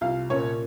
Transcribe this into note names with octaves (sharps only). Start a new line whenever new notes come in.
C2 F4 F5
A#2 C#4 C#5